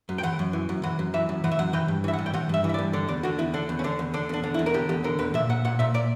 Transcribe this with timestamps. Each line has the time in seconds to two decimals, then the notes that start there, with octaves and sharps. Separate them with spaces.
0.09 F#2
0.18 G5
0.23 E3 F#5
0.39 F#2
0.53 E3
0.69 F#2
0.83 E3 F#5
0.99 F#2
1.14 E3 E5
1.29 F#2
1.44 E3 F#5
1.51 E5
1.59 F#2 F#5
1.73 E3 G5
1.88 G2
2.04 E3 E5
2.14 F#5
2.18 G2
2.26 G5
2.34 E3 F#5
2.49 G2 E5
2.64 E3
2.69 E5
2.74 D5
2.79 G2
2.93 D3 D5
3.08 E2 D5
3.23 D3 F#4
3.39 E2 E4
3.54 D3 D4
3.69 E2
3.79 C#4
3.84 D3 D4
3.99 E2
4.14 D3 D4
4.29 E2 D4
4.44 D3
4.54 E4
4.59 E2
4.66 A#4
4.74 D3 G4
4.89 E2 G4
5.04 D3 A#4
5.19 E2 B4
5.34 A#2 E5
5.49 A#2 F#5
5.65 A#2 F#5
5.79 A#2 E5
5.94 A#2 D5